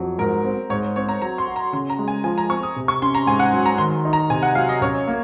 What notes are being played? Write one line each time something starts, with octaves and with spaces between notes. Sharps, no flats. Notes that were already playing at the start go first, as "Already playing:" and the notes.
Already playing: F2 F#3
G#2 A#4
C4
G#2 C#5
C4 C#5
A#5
F#3 A#5
C6
F#4
A#5
C#3 C6
A#5
G#3
G#5
F3 G#5
A#5
C4 C#6
D#6
C3
C#6
C#4 C6
A#5
G#2 G#5
F#5
F#3
A#5
D#3 C6
D#4
A#5
C3 G#5
F#5
F#3 F5
D#5
F#2 C#5
A#3